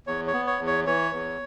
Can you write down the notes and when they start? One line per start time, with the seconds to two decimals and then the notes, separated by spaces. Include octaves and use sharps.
0.07 E2 C#5
0.28 C#5
0.33 B3
0.47 C#5
0.59 E2
0.67 C#5
0.86 E3 C#5
1.12 E2